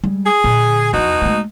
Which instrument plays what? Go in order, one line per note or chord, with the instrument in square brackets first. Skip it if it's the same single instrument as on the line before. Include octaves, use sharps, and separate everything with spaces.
[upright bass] G3 G#3
[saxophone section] G#4
[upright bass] A#2 D3
[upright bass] E2 F3 [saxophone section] B2 D#4 F#4
[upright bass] G#3 A3